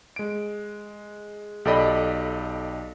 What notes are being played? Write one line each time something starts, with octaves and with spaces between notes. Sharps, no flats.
G#3 D7
B1 G4 A4 D5 D#5 B5